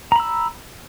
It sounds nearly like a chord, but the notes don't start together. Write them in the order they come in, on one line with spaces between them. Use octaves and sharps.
A#5 B5 E6